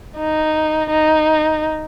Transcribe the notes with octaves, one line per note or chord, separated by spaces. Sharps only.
D#4
D#4